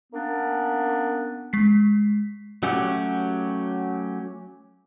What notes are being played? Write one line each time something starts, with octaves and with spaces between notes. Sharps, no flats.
A#3 B3 C#4 D4
G#3 B6 C7
F#3 A3 C#4 F#4 G4